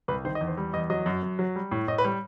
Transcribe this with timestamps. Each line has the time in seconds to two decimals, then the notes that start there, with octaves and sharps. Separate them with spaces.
0.08 C2 B4
0.25 D#3 C5
0.35 D#5
0.41 E2
0.47 C5
0.57 G3
0.73 E2 D#5
0.90 F#3 D#5
1.06 F#2
1.23 F#2
1.39 F#3
1.56 G3
1.71 A2
1.88 A2 D#5
1.98 B4
2.05 G3